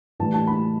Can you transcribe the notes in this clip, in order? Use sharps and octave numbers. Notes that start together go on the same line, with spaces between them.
A2 E3 G3 A5
A5
B5